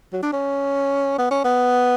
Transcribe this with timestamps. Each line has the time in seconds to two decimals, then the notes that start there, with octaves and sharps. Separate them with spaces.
0.13 F#3
0.22 D4
0.33 C#4
1.19 B3
1.31 C#4
1.44 B3